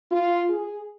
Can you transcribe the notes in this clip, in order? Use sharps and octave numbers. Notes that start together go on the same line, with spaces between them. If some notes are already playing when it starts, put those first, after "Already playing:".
F4
G#4